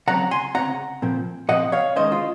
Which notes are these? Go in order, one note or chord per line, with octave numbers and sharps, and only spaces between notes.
C#3 F#3 C4 F#5 A#5
G#5 C6
C#3 F#3 C4 F#5 A#5
A#2 F3 C4
A#2 F3 C4 D#5 F#5
C#5 F5
D#3 G#3 C#4 C5 D#5
F4